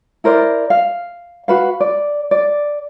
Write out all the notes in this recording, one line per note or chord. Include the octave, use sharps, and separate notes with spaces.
E4 A#4 C5 D5
F5
F#4 B4 F5
D5
D5